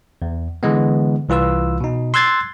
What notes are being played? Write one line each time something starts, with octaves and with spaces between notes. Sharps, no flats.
E2
D3 E3 G#3 B3
C2 E3 F4 B4 E6
B2 D#4
C6 E6 F#6 G#6 A6 C7